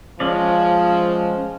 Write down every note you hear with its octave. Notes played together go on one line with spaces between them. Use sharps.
F3 G#3 C#4 D5